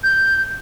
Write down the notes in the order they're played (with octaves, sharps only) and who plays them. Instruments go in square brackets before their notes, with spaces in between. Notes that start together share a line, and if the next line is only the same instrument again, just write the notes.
[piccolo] G6